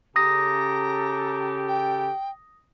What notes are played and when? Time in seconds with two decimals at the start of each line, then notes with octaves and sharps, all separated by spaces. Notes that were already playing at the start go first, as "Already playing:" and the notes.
0.16 C#3 G4 A4 A#5 D#6 A#6
1.68 G5